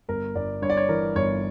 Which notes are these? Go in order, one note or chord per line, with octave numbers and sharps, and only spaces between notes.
G1 A#4
G1 D5
G2 C#5
D5
C#5
E3 A#4
G1 C#5